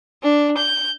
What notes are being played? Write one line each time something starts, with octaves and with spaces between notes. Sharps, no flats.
D4
G6